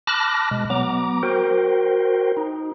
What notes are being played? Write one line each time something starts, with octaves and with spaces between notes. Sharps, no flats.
A5 B5 D6 F6 F#6 A#6
B2 G#3
F#3 B3 A#5 D6
F#4 A#4 C5 G5
D#4